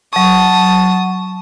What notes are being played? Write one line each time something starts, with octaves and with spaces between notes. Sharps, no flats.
F#3 A5 C#6 D#6